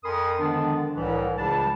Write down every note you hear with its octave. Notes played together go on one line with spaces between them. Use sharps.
F2 A#4 G#5 B5 C6 D#6
D3 D#3 F3 G#3 B3 D4
C2 A2 E3 G3
C#2 C#3 F3 G3 D4 A5